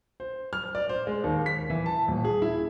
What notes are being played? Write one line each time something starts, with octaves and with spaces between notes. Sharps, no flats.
C5
F6
D5
C5
G#3
D#2
B6
E3
A5
D#1
G#4
E4